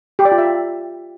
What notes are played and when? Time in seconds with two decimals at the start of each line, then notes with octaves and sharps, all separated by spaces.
0.19 G4
0.25 D5
0.32 F4
0.38 E5